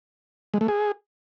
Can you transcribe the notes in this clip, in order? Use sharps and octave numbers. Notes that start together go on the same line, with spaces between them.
G#3
A3
G#4